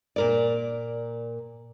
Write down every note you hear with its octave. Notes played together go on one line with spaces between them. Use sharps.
A#2 A#4 D5